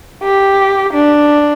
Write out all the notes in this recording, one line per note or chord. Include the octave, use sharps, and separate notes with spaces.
G4
D4